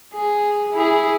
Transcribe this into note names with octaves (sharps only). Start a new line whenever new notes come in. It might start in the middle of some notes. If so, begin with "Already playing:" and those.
G#4
E4 G#4